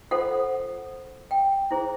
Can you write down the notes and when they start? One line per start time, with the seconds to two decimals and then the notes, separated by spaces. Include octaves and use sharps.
0.11 F4 A4 C5 F#5
1.31 G5
1.71 E4 G#4 C5